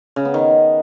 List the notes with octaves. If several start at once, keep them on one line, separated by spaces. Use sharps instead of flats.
C#3
B3
D#3